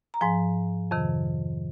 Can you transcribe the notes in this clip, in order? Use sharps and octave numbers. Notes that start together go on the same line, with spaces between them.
A#5
G#2 F3 G#5
F2 C3 D#3